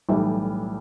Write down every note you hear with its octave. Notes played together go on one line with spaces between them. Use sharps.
B1 A2 E3 G3